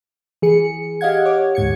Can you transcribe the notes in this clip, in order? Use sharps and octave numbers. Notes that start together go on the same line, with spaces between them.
E3 G#4 C#7
G4 D#5 F5 F#5 G#6
C#5 D6
D2 G#2 G#6 C#7